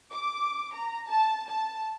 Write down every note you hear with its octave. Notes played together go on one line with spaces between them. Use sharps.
D6
A#5
A5
A5